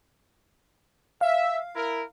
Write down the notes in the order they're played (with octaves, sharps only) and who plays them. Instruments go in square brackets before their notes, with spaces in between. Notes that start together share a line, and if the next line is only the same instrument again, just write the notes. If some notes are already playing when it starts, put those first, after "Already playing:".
[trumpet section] E5 [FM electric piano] F5
[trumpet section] E4 A#4